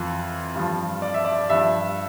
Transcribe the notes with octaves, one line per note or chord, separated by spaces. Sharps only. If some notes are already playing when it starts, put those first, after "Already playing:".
Already playing: F2 E3
G2 F3
D5
E5
D5
G2 F3 E5